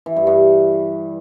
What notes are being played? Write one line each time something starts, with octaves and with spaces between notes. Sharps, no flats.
E3
G2
G2